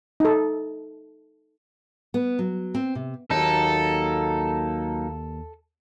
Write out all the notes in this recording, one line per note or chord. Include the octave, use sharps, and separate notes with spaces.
D#4 A4
B3
F#3
C4
C3
D#2 F#3 A#3 D#4 A4